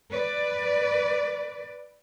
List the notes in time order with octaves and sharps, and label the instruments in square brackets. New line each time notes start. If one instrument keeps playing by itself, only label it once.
[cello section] B4 D5